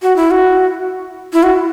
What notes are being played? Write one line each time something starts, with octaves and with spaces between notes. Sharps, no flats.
F#4
E4
F#4
E4
F#4